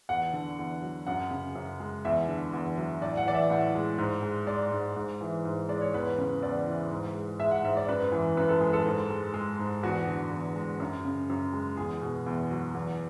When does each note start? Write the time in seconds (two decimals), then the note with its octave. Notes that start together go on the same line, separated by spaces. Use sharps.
0.09 E2 F#5
0.33 D3
0.59 E2
0.82 F#3
1.07 F#2 F#5
1.31 C#3
1.55 F#2
1.80 G#3
2.05 E2 E5
2.28 D3
2.53 E2
2.78 F#3
3.02 A2 D5
3.17 F#5
3.25 E3 D5
3.34 E5
3.50 A2 F#5
3.75 G#3
3.98 G#2
4.23 G#3
4.47 G#3 D5
4.72 G#2
4.96 G#2
5.21 E3
5.45 G#2
5.69 G#3 D5
5.81 C#5
5.94 E2 B4
6.18 C#3
6.43 E2 D5
6.67 E3
6.91 G#2
7.15 G#3
7.40 G#3 E5
7.51 F#5
7.64 G#2 E5
7.77 D5
7.89 F#2 B4
8.12 E3
8.37 F#2 B4
8.49 A4
8.61 G#3 G#4
8.73 A4
8.86 G#2
9.10 G#3
9.34 G#3
9.59 G#2
9.83 E2 F#4
10.08 D3
10.31 E2
10.56 G#3
10.80 F#2
11.05 C#3
11.30 F#2
11.53 G#3
11.77 E2 G#4
12.01 B2
12.26 E2
12.51 F#3
12.75 E2